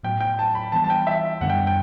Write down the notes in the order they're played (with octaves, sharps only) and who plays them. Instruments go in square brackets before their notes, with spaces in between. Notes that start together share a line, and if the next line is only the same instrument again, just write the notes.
[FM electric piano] A2 F#3 B3 [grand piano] G5
[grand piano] G5
A5
B5
[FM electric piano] E3 G3 B3 [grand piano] A5
[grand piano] A5
G5
E5
[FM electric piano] F#2 D3 G3 B3 [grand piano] F#5
[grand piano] G5
G5